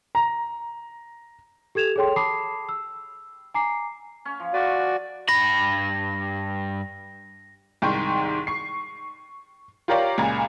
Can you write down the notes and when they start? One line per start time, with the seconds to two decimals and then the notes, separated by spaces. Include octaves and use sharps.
0.15 A#5
1.75 G4 A4 G#6 E7 F7
1.96 G#4 A4 C#5 G5 C6
2.16 A5 B5 D6 D#6 C7
2.69 E6
3.54 G#5 A#5 D6 C7
4.25 C#4
4.40 F3
4.54 F#4 B4 D5 C#6
5.29 G2 B5 A#6
7.82 C2 G#2 D#3 G5 C6 C#6
8.47 C#6 C7
9.88 F4 G4 A#4 C#5 D5 F5
10.18 C#2 A#2 G#5 A#5